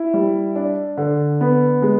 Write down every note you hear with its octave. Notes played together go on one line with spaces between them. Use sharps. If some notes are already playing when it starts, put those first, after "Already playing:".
Already playing: E4
G3
D4
D3
B3
G#3